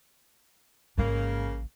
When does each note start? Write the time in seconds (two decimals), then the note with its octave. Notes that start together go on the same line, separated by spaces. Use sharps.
0.98 A1 G#2 C#3 G#3 A#3